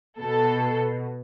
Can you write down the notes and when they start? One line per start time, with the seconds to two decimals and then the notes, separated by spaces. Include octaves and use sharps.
0.20 B2 A4